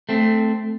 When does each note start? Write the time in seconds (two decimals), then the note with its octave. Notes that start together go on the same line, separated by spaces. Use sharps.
0.09 A3 C4